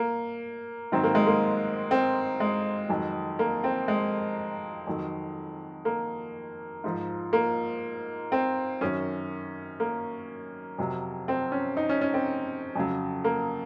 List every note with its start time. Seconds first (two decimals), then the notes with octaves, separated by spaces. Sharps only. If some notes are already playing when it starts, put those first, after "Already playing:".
Already playing: A#3
0.92 G#2 D#3 F#3 C4
1.04 A#3
1.15 G#3
1.27 A#3
1.91 C4
2.40 G#3
2.89 F2 D#3 F#3
3.39 A#3
3.64 C4
3.88 G#3
4.87 F2 D#3 F#3
5.85 A#3
6.84 G#2 F3
7.33 A#3
8.32 C4
8.81 F#2 D#3 F#3 C#4
9.80 A#3
10.78 F2 C3 F#3
11.28 C4
11.52 C#4
11.77 D#4
11.89 C#4
12.01 C#4
12.14 C4
12.76 F2 C#3 F#3
13.25 A#3